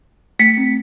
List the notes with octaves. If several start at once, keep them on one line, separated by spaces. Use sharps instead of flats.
A3 B6 C#7
C4